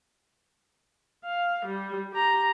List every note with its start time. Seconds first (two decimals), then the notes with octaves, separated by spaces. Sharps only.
1.24 F5
1.66 G3
2.12 G4 A#5